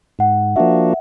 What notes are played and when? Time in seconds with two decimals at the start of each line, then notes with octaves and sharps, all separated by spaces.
0.19 G#2 F#5
0.56 F3 A#3 D4 F#4 E5